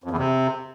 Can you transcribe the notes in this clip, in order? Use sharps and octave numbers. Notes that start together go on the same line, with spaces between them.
F2
E2
C3